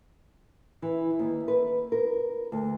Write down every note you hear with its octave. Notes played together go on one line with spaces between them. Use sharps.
E3
D#2
B4
A#4
D2